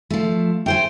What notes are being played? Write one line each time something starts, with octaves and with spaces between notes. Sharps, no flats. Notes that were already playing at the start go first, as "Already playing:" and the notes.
F3 A3
A3 C5 G5 G#5